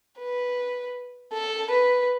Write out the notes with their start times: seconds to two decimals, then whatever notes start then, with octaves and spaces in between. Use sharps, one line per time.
0.19 B4
1.33 A4
1.71 B4